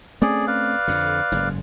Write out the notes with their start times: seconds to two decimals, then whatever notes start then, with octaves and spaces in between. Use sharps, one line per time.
0.22 A3 C4 C#4 G#4 D5
0.47 B4 D5 F5
0.88 F2 D3
1.32 F#1 G#2